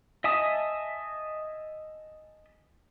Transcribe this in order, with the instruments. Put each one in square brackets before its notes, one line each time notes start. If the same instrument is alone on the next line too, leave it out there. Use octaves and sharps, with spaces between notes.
[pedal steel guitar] D#5 E5 G#5 A5 D#6